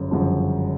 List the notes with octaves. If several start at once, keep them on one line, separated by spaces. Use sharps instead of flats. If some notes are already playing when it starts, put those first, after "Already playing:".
Already playing: G1 F#2 C#3
G1 F#2 C#3 F3